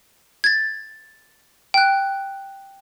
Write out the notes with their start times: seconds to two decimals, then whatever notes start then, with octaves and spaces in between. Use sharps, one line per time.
0.44 G#6 A6
1.74 G5 F#6